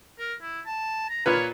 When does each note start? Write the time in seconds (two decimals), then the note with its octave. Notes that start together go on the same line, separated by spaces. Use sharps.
0.19 A#4
0.42 E4
0.66 A5
1.09 A#5
1.26 A#2 F4 B4 C#5